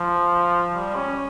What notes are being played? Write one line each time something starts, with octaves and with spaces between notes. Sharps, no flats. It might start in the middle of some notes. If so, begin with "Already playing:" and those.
Already playing: F3
G3
C#4